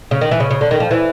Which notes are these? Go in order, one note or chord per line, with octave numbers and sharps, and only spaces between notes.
C#3
D#3
E3
C#3
C#3
D3
D#3
F3
E3